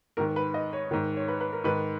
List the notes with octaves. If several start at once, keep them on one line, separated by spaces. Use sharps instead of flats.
G#2 D#3 A#4
B4
D#5
C#5
G#2 D#3
C#5
B4
B4
A#4
G#2 D#3 B4